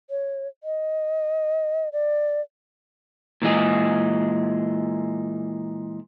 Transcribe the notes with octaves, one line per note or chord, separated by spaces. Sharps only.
C#5
D#5
D5
A#2 E3 G#3 G#4